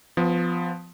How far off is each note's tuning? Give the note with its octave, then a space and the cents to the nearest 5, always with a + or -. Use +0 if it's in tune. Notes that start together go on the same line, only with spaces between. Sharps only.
F3 +0 B3 +25